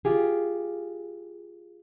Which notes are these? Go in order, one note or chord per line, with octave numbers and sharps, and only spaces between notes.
F4 G4 G#4